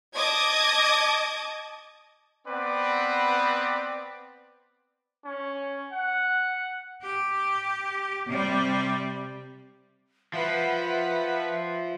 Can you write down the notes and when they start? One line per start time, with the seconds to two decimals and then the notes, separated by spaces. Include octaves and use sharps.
0.16 D#5 A5 D6 D#6 G#6
2.46 B3 C4 B4 D5
5.25 C#4
5.93 F#5
7.03 G4
8.27 C3 G3
10.34 F3 B4 E5 F#5 B6